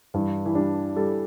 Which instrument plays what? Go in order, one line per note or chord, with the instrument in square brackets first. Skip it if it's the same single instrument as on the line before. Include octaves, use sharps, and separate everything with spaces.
[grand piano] G2 [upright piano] E3
[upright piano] E3
[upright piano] G3 [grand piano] D4
[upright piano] G3 [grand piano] A4